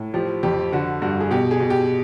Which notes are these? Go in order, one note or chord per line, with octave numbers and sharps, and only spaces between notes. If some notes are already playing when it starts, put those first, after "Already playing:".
Already playing: A2
F3 G4
F2 G4
D3 F#4
G2 F#4
G#4
B2 G4
G#4
B2
G4